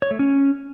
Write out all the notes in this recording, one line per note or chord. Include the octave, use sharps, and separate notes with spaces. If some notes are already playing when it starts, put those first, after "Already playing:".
C#5
A3
C#4